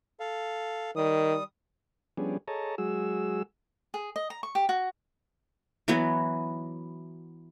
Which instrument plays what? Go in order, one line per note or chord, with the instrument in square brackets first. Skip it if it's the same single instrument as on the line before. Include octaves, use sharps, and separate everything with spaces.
[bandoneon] A4 F5
[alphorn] D#3 [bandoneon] G3 D#6
[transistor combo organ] F3 G3 B3 C#4 D4 G#4
G#4 A4 C#5 D#5 A5 A#5
F#3 G#3 F#4 G#4 E6
[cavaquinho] G#4
D#5
A#5
C#6
G4
F#4
[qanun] E3 F#3 B3 F#4